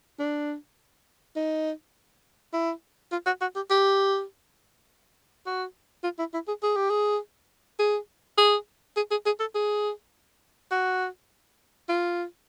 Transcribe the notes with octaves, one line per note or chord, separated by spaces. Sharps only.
D4
D#4
E4
F4
F#4
F#4
G4
G4
F#4
F4
E4
E4
G#4
G#4
G4
G#4
G#4
G#4
G#4
G#4
G#4
A4
G#4
F#4
F4